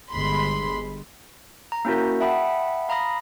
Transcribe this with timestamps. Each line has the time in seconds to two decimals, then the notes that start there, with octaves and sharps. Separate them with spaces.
0.11 G1 G#3 B5 C6
1.72 A#5
1.85 A#3 C#4 E4 F#4 A#4
2.20 E5 F#5 G5 A5 B5 D#6
2.89 F5 A#5 B5 D#6 A#6